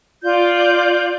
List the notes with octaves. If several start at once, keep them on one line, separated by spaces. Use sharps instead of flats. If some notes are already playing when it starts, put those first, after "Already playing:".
F4 D5 G6